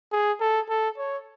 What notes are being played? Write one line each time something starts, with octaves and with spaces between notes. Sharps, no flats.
G#4
A4
A4
C#5